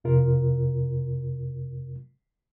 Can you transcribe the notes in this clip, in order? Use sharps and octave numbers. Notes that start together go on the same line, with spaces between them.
F2 C3 F4 A#4